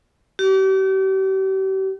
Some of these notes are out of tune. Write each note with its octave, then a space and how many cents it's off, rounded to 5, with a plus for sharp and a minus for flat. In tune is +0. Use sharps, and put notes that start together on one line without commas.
G4 -40